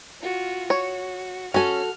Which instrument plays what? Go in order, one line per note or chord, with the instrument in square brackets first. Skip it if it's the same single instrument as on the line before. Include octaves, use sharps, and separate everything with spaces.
[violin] F4 F#4
[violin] F#4 [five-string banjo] C#5
[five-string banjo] C#4 G#5 [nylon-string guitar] F#4 A4 [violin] F6